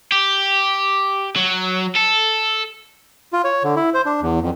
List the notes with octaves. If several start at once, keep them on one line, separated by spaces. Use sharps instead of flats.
G4
F#3
A4
F4
C#5
D3
E4
C5
D4
E2
F2